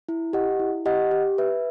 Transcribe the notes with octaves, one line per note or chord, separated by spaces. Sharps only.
E4
G4 D#5 F#5
E4
G4 D#5 F#5
G4
B4 E5